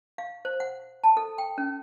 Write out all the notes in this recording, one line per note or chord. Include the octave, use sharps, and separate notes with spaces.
F5
C5
F#5
A5
A4
G5
C#4